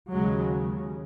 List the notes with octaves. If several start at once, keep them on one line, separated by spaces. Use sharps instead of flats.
D#2 C#3 F#3 G#3